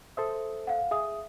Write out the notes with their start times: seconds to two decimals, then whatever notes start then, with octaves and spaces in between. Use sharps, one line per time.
0.17 A4 C5 E5 D#6
0.67 F5 F#5
0.91 G#4 E5 D#6